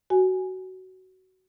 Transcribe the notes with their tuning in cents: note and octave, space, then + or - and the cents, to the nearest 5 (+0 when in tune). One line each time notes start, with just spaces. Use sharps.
F#4 +15 G#5 +0